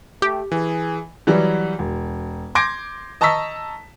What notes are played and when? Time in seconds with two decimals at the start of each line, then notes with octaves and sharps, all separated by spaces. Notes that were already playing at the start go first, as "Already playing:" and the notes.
0.22 A3 G4
0.52 E3 G#4
1.27 E3 F#3 G3
1.79 E1
2.55 C6 D6 G6 G#6 A#6 D7
3.21 D#5 A5 A#5 C#6 E6 B6